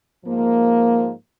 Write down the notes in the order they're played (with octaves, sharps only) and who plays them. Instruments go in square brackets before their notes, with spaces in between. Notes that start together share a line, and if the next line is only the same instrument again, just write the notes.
[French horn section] G#2 F3 A#3